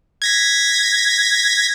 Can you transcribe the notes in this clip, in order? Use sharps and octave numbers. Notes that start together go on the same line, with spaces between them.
G#6 A#6 B6